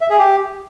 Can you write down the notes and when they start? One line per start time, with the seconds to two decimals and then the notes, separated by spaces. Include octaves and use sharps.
0.01 E5
0.10 G#4
0.19 G4